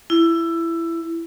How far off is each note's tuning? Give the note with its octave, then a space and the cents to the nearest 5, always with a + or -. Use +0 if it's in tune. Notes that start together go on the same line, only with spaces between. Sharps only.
E4 +15